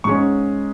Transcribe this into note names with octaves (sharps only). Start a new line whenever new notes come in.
G#2 G#3 C#4 C#6